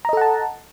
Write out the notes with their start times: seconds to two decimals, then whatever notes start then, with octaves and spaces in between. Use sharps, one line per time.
0.05 A#5
0.09 D#5
0.13 A4
0.17 F#5
0.21 A5